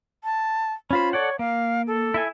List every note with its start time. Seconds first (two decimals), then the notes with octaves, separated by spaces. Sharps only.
0.24 A5
0.91 C#4 F4 C5 B5
1.13 A4 C#5 D5 F#5
1.39 A#3 F5
1.87 A4
2.14 E4 E5 G#5